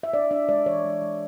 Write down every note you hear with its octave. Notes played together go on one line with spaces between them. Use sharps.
E5
D4 D5
D4 E5
G#3 D5
E3 C#5
G#3
G#3